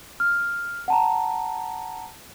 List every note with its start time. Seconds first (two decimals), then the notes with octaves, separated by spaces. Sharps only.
0.20 F6
0.88 F#5 A5 A#5